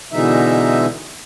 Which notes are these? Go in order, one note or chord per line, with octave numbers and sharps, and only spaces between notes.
B2 D3 E3 G#3 D#4 E5